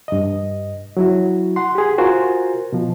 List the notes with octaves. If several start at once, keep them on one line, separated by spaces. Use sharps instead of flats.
G2 D#5
F#3 E4 F#4
F#5 C6
G4 G#4
F4 F#4 A#4 C5 G#5
B2 F3